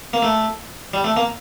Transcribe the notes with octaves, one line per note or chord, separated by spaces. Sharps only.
A#3
A3
G3
A3
A#3